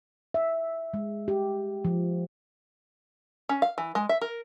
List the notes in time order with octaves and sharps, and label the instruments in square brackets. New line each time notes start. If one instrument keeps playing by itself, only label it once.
[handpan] E5
G#3
G4
F3
[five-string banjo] C#4
F5
E3
G#3
E5
A#4